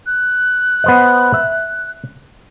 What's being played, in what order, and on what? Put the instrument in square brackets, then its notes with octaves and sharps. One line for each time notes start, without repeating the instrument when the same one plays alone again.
[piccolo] F#6
[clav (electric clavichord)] B3 C5 D#5
E5